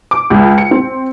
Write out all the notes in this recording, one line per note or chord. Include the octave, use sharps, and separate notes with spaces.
D6
C#2
C#7
C4